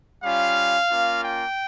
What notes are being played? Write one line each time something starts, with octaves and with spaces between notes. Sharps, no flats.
G3 C#4 F4 F5
A#3 C#4 F4
G5